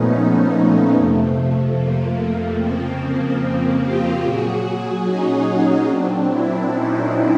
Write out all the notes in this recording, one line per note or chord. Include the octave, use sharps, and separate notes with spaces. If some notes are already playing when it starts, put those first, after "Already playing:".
Already playing: A#2 F3 A3 B3 C#4 D#4
F2 C3 F3 A3
A#3
F2 C#3 F3 A#3 C4
F4 G4
A#2 F#3 F#4 G#4
C#4 D#4
A#2 F#3 C4 D4
D4 E4
C#4 D#4